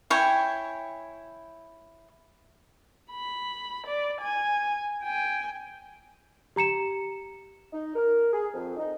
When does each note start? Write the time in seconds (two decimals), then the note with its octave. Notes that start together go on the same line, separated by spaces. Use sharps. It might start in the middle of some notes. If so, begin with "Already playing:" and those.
0.10 E4 C#5 G5 G#5
3.11 B5
3.87 D5
4.21 G#5
5.03 G5 G#5
6.56 G4 A#5 C#7 E7
7.72 D#4
7.95 A#4
8.32 G#4
8.53 F2
8.77 D#4